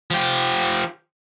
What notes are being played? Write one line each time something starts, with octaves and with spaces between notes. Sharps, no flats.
F3 G4